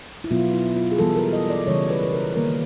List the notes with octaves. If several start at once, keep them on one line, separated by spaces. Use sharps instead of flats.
E4
B2 F#3 B3 F4
E4
F4
G#4
E3 G3 B3 A4
A#4
D#5
D5
C#3 E3 G3 C#5
B4
B4
A#4
D#3 G3 A#3 A#4